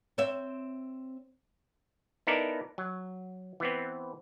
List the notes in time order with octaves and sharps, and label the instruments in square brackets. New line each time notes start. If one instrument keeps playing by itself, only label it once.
[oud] C4 C#5 E5
[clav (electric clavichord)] B3 D#4 E4 A4 A#4 D5
F#3
E3 B3 C4